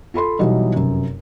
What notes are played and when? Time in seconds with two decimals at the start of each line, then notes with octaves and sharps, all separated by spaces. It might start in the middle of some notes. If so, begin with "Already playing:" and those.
0.14 F4 A4 B5 C6
0.39 B2 E3 F#3 G3 D#4
0.76 F1 F#2